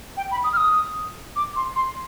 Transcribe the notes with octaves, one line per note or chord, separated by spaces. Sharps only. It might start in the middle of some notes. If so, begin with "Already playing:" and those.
G5
B5
D#6
F6
D#6
D6
C6
C6